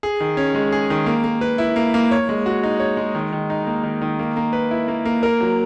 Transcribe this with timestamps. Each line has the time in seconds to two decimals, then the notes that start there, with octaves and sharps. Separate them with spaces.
0.03 G#4
0.20 D#3
0.37 C#4
0.55 G#3
0.72 G#4
0.90 D#3
1.06 A#3
1.24 A#3
1.41 B4
1.58 E4
1.76 A#3
1.94 A#3
2.11 C#5
2.29 G#3
2.46 F#4
2.63 D#4
2.80 C#5
2.97 G#3
3.15 D#3
3.33 D#3
3.50 D#4
3.67 A#3
3.83 D#3
4.02 D#3
4.19 A#3
4.37 A#3
4.53 B4
4.71 E4
4.88 A#3
5.05 A#3
5.23 A#4
5.41 F#3